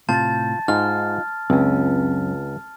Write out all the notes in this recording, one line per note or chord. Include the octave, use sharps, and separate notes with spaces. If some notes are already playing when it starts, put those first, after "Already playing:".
A2 C3 F4 A5 G6 A6
G#2 D#4 F4 F6
C#2 F#2 C4 C#4